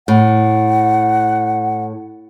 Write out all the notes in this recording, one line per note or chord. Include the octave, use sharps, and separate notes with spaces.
A2 F#5